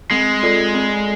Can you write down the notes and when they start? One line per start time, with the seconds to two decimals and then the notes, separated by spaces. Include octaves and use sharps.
0.11 G#3 C4
0.43 F4 A4 D5
0.74 C4